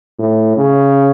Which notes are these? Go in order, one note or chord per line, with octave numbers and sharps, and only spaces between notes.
A2
C#3